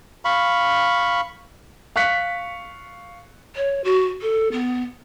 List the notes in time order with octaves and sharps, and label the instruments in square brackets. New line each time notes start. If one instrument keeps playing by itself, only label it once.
[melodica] F5 B5 C#6
[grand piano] F5 C#6 F#6 B6 C#7
[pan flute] C#5
F#4
A4
B3